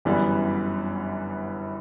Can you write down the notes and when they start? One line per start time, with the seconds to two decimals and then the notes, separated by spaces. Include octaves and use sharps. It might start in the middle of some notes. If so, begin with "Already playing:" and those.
0.05 G1 F#2 E3 G3 B3